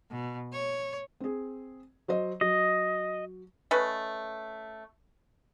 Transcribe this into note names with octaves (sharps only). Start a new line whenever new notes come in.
B2
C#5
C4 G#4
F#3 C5 D#5
F#3 D#5
A3 C#4 B4 D#5